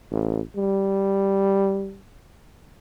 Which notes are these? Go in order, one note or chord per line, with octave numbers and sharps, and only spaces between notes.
A1
G3